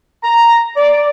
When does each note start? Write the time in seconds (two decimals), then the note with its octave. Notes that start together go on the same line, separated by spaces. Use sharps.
0.24 A#5
0.77 D5